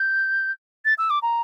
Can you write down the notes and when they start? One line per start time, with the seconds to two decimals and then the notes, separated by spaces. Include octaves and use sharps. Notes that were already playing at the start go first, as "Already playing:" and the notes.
Already playing: G6
0.85 A6
0.98 E6
1.10 D6
1.22 A#5